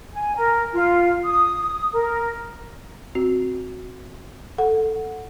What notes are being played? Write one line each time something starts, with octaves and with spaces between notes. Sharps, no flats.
G#5
A#4
F4
D#6
A#4
C4 F#4
A4 F#5